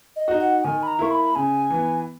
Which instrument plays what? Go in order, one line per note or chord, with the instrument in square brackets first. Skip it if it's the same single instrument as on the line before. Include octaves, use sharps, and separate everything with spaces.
[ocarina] D#5
[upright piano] D#4 F#4
[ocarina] F#5
[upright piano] D#3 [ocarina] G#5
[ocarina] B5
A#5
[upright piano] A#3 E4 [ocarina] C#6
[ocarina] B5
[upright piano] C#3 [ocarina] G#5
[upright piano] E3 B3